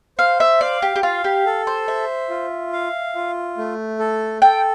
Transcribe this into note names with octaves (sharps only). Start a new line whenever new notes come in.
C5 F5
E5
D5 F5
G4
G4
F4 F5
G4
A4
C5
C5 E5
F4
F5
F4
A3
A4
A4 G5